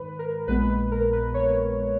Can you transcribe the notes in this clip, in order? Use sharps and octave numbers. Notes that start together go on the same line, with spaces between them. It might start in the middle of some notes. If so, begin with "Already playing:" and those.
Already playing: G#2 D#3 B4
A#4
A#1 A#2 G#3 B3 B4
B4
A#4
B4
C#5